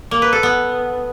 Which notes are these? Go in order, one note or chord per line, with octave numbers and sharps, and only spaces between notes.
A#3
B4
A4
B3